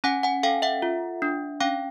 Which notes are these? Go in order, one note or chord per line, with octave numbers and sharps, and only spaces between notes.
C#4 F#5 G#5
F#5 G#5
A4 F5 G5
E5 F#5
F4
D4
C#4 F5 G5